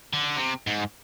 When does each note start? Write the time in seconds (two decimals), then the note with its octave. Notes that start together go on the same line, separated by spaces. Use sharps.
0.13 D3
0.37 C3
0.67 G#2